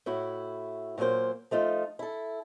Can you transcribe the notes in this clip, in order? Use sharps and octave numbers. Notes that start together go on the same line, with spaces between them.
A2 E4 F#4
A#2 F#3 G#3 A#3 C5
F3 A3 D#4 F4
E4 A4